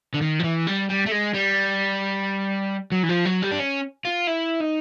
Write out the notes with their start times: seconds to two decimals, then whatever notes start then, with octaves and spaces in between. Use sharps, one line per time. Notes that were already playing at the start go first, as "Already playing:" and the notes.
0.14 D3
0.22 D#3
0.39 F3
0.44 E3
0.67 G3
0.89 G3
1.06 A3
1.11 G#3
1.34 G3
2.92 F#3
3.03 E3
3.09 F3
3.25 F#3
3.42 G3
3.51 D4
3.59 C#4
4.05 F4
4.27 E4
4.61 D#4